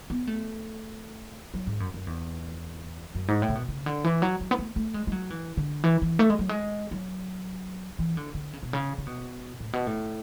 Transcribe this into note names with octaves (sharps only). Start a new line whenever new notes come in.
B3
A3
F#3
G#2
F#2
F#2
E2
F#2
G#2
A2
C#3
B2
C#3
D3
E3
F#3
F#3
B3
A3
A3
G#3
G#3
F#3
E3
D3
E3
E3
A3
G#3
F#3
G#3
F#3
E3
D3
D3
C#3
B2
C#3
C#3
B2
A2
B2
A2